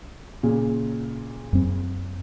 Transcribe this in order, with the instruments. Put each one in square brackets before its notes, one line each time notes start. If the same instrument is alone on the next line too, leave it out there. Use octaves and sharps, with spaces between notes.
[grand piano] A#2 C#3
[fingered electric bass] F#2 C4